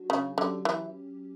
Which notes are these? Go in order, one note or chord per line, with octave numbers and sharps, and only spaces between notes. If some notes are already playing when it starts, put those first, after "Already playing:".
Already playing: F#3 D4 F#4
C#3
D3 F#3 C#4 G4
E3